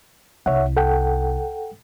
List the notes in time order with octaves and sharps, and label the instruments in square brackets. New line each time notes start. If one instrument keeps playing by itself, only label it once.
[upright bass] C2 [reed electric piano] C#5 E5 F#5
[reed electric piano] A4 F#5 G5